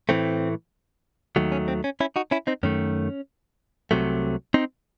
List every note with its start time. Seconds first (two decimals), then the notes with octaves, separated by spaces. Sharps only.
0.09 A2 E3 A3 C4
1.36 D#2 D#3 F#3 A3
1.52 C#4
1.68 C4
1.84 C#4
2.00 C#4 E4
2.16 D#4 F#4
2.31 C#4 E4
2.47 C4 D#4
2.63 F#2 D#3 A3 C#4
3.91 C2 C3 F#3 A3
4.54 C4 D#4